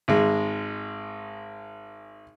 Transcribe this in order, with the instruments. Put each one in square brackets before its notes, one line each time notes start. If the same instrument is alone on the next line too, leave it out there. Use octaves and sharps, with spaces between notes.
[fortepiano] G#1 G#3